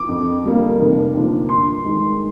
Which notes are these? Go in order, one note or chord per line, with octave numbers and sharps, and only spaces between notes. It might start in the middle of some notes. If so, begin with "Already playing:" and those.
Already playing: D6
F2
D3 G3 A#3
F1
D#2 D3 F3
G2 C6
D#3 G#3